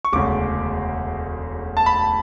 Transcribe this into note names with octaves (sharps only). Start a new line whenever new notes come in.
C#6
E1 D2 C#3 D6
A5
B5